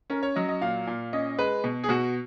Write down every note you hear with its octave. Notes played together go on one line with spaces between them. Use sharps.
C#4 A#4
C#5
F#3 D#5
D#5
A#2 F5
A#2
C#4 D#5
G#3 B4
B2
G#4
B2 F#4